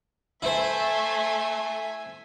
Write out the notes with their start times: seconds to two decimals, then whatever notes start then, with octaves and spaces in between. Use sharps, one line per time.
0.42 A3 E4 C5 E5 G#5 C6